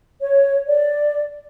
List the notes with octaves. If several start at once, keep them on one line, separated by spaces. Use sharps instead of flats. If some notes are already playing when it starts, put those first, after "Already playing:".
C#5
D5